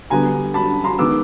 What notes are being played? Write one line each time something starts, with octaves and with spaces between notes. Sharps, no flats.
D3 G3 B3 G#5 A#5
A5 B5
A#5 C6
D#3 G#3 B3 D6 E6